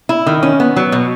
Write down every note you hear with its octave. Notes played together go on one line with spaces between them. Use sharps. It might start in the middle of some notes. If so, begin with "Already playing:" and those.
E4
D#3
C#4
B3
F#3
B2